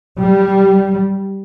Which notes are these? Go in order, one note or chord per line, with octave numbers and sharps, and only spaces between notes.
G3